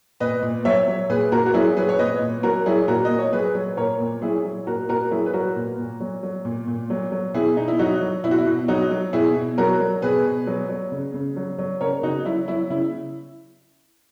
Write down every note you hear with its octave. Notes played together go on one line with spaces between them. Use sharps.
A#2 B4 D#5
A#2
F#3 C#5 E5
F#3
A#2 G#4 B4
A#2 F#4 A#4
F#4
F#3 E4 G#4
F#3 G#4 B4
C#5
A#2 B4 D#5
A#2
F#3 F#4 A#4
F#3 E4 G#4
A#2 F#4 A#4
D#5
A#2
C#5
F#3 G#4 B4
F#3
A#2 A#4 C#5
A#2
F#3 E4 G#4
F#3
A#2 F#4 A#4
A#2 F#4 A#4
F#3 E4 G#4
B4
F#3 F#4 A#4
A#2
A#2
F#3
F#3
A#2
A#2
F#3
F#3
B2 E4 G#4
B2 D#4
E4
F#3 D#4 F#4
F#3
B2 E4
F#4
E4
B2
F#3 D#4 F#4
F#3
B2 E4 G#4
B2
F#3 F#4 A#4
F#3
B2 G#4 B4
B2
F#3
F#3
C#3
C#3
F#3
F#3
C#3 A#4 C#5
C#3 D#4 F#4
F#3 E4
F#3 E4
C#3 E4